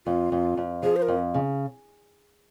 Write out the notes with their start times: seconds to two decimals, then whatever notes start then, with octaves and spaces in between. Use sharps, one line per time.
0.06 F2 F4
0.32 F2
0.57 F2
0.83 F3 G#4
0.96 C5
1.02 A#4
1.08 F2
1.34 C#3